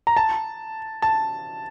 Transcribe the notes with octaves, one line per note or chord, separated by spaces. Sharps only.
A#5
A5
A5